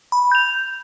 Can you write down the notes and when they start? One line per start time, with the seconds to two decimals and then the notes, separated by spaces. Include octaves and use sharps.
0.12 B5
0.32 G6 F7